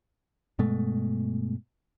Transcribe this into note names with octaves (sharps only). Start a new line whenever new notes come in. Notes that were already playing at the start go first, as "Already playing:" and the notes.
G2 B2 G#3 A3